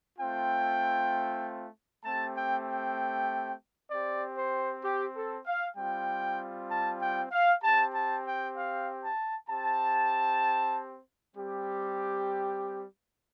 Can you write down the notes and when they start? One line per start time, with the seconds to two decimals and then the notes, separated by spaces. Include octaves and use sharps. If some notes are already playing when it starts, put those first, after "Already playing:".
0.18 A3 C4 F4 G5
2.04 A3 C4 G4 A5
2.36 G5
2.67 G5
3.90 C4 G4 D5
4.37 C5
4.83 G4
5.15 A4
5.46 F5
5.76 G3 C4 F4 G5
6.70 A5
7.01 G5
7.32 F5
7.63 C4 G4 A5
7.94 A5
8.25 G5
8.56 F5
9.03 A5
9.49 C4 G4 A5
11.35 G3 C4 G4